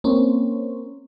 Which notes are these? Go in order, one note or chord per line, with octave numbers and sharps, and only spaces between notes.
A#3 C4 C#4